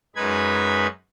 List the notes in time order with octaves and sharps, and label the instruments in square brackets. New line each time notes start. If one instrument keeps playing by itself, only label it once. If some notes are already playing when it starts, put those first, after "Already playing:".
[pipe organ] F#2 G#3 D#4 B4 B5 G#6